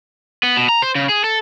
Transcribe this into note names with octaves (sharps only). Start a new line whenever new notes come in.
B3
B2
A#5
C5
C#3
G#4
A4